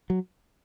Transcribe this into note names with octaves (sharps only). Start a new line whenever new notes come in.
F#3